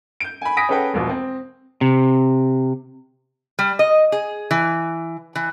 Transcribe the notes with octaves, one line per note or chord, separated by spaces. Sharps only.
G6 D7
G#5 B5
G#5 B5 D#6 A#6 B6 D7
C#4 G#4 A4 B4 F#5 G5
E1 A#1 B2
C4
C3
G3
D#5
G#4
E3
E3